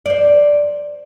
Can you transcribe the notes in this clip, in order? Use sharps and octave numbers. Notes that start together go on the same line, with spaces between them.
C5 D5